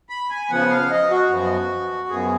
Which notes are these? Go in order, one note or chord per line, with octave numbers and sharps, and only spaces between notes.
B5
G#5
C#3 F3 B3 F#5
F5
D#5
F#4
F#2 F3 B3
F#2 F3 B3 G#4